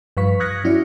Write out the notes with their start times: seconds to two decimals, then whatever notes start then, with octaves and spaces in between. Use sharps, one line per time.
0.17 G2 F3 B4 F5 C#6 B6
0.40 D#6 F6 F#6 G#6 A#6 C#7
0.64 F#3 C#4 E4 F#4 D5 C#7